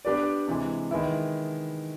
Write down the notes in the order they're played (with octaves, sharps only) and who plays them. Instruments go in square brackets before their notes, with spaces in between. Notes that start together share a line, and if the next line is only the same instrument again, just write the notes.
[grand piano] B3 D4 G4 B4 D5
C3 E3 G#3
D#3 G#3 B3 E4